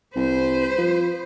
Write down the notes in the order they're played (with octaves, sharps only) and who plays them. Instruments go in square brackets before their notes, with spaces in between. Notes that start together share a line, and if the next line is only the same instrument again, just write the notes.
[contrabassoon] C2 [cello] B4 C5
[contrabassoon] F3